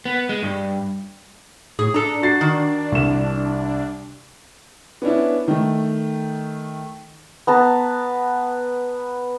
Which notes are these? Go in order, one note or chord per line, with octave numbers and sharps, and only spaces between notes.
B3
G#3
G2
A2 G#4
D4 A4 A#5
F#4 A6 C7
D#3
C2 E7
B3 C#4 D4 E4
D#3 A3
B3 A5 A#5